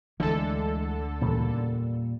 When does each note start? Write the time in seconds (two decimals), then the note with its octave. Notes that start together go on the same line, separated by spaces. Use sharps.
0.20 D2 D3 E3 G#3 A4
1.21 E2 A#2 C#3 G3